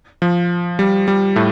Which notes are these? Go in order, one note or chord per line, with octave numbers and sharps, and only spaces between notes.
F3
G3
G3
A2 A3